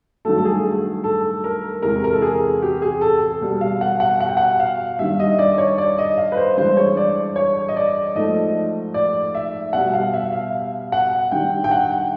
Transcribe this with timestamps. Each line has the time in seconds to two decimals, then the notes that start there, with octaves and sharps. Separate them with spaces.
0.25 G2 D#3 F#3 A3 A4
0.38 A4
0.45 G#4
1.04 A4
1.44 A#4
1.82 E2 C3 E3 G#3 A#4
2.04 A#4
2.13 A4
2.22 G#4
2.62 G4
2.82 G#4
3.01 A4
3.41 B2 G3
3.61 F5
3.81 F#5
4.00 F#5
4.20 F#5
4.29 G5
4.37 F#5
4.60 F5
4.99 G2 D#3 G3 E5
5.20 D#5
5.39 D5
5.58 C#5
5.78 D5
5.98 D#5
6.17 F5
6.32 B4
6.37 C5
6.57 G2 E3 G#3 C5
6.77 C#5
6.97 D5
7.36 C#5
7.68 D#5
7.76 D5
8.15 G#2 F3 A3 D#5
8.94 D5
9.35 E5
9.73 B2 G3 F#5
9.94 F5
10.14 E5
10.33 F5
10.92 F#5
11.31 G2 D#3 G3 G5
11.64 G5
11.71 F#5